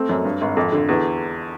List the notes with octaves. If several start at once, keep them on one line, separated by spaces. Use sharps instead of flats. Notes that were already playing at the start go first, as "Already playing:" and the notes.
Already playing: A3 C4
F#2
G2
G#1
F2
D3
E2